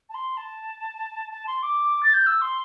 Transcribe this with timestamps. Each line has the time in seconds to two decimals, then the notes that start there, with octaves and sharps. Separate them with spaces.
0.09 A5
0.14 C6
0.37 A5
1.31 A5
1.47 C6
1.63 D6
2.03 A6
2.14 G6
2.27 E6
2.41 C6